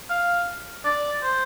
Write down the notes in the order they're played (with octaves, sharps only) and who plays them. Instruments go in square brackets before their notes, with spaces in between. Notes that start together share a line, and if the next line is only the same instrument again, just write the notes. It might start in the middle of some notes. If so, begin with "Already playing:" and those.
[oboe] F5
D5
C5